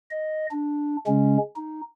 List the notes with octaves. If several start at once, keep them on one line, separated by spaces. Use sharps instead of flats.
D#5
D4
C#3 G#3 C#4
D#4